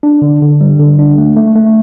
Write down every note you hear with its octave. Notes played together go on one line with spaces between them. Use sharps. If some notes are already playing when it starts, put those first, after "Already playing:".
D4
D3
D3
G3
D3
D4
A3
A3
A3